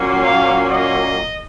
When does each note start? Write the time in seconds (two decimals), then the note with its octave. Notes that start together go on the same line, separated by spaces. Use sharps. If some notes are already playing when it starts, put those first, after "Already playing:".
Already playing: A#2 F#3 A#3 C#4
0.22 F5
0.70 D#5